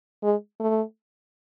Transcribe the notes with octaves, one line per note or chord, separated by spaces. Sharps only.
G#3
A3